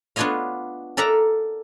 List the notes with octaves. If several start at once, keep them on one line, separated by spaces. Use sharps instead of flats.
B3 D4 F4 C#5 D#5 F5
A4 A#4 D5 E5 F#5 A#5